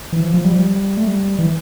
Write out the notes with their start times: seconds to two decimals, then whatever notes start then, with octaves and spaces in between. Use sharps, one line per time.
0.13 E3
0.22 F3
0.34 F3
0.45 G3
0.52 F3
0.59 G3
0.97 A3
1.08 G3
1.39 E3